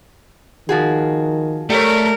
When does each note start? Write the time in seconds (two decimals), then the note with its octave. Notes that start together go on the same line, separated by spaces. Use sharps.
0.69 D#3 F3 F#4 G#4
1.70 G3 A3 A#4 C#5